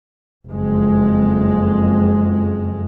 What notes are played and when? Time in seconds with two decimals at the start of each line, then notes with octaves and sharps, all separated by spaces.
0.50 F#1 F2 G#3